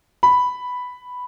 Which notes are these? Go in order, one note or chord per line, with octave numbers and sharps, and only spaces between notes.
B5